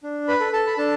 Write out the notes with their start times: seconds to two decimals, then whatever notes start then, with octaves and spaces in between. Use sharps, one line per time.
0.03 D4
0.28 B4 B5
0.40 A4
0.53 A4 A5
0.67 B5
0.78 D4 A4 A5